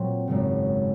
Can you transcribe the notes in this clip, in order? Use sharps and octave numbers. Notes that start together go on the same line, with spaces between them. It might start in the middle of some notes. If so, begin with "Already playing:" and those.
Already playing: A#2 F#3 C4
G#1 F#2 C#3